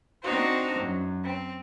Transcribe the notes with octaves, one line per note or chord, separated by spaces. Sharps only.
C4 D4 D#4 F#4 C5
F#2
C4